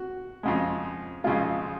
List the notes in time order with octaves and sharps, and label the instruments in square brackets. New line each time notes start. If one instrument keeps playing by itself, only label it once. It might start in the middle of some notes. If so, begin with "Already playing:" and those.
Already playing: [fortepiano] F#4
F2 C#3 G#3
F2 C#3 G#3 F4